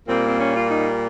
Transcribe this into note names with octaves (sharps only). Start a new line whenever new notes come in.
A#2 G3 A#3 C4
C4
C#4
F4
D#4